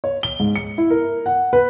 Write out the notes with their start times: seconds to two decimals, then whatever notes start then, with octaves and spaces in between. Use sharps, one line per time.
0.04 C#5
0.23 G7
0.40 G#2
0.56 C#7
0.78 E4
0.90 A#4
1.26 F#5
1.53 B4